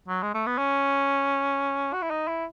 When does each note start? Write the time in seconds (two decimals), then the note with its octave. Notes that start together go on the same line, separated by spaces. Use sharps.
0.08 F#3
0.23 G#3
0.34 A3
0.47 B3
0.58 C#4
1.93 F#4
2.02 E4
2.10 D#4
2.28 E4